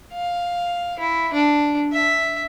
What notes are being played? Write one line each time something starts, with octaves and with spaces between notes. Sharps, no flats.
F5
E4
D4
E5